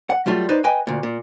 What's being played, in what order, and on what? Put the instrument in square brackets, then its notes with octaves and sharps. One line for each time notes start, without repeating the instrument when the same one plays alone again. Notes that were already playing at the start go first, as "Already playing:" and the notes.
[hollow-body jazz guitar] F#5
F#3 G3 A3 F4
D#4 B4 C5 D5
B4 D#5 G5 G#5
D2 A#2
A#2